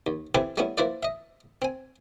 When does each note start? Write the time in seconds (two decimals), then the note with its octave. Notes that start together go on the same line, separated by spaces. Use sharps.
0.07 D#2
0.35 C4 E4 G4 A4 B4 G#5
0.57 G3 A3 B3 C#4 E4
0.78 F3 A#3 E4 B4 C5 D5
1.03 D#5 E5
1.62 C4 G#5